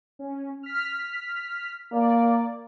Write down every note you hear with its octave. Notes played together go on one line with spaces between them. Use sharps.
C#4
F6 B6
A#3 D5